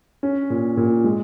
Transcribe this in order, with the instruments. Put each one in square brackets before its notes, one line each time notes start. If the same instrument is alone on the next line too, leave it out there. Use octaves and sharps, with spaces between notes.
[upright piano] C#4
A#2
A#2
G#3